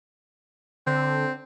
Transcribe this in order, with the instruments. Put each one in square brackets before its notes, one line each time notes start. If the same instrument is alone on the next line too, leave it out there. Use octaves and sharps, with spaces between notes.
[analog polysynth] D3 [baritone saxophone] C4